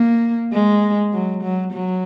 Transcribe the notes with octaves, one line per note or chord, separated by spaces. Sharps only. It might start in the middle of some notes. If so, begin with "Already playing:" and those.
Already playing: A#3
G#3
F#3
F#3
F#3